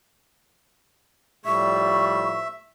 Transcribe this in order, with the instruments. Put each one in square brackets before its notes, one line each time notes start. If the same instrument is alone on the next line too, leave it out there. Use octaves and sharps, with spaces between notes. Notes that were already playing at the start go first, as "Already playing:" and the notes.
[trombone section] A2 F3 G3 [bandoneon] E5 [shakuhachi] C#6